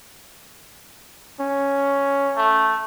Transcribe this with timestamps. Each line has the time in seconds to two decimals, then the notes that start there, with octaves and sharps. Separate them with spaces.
1.40 C#4
2.37 A3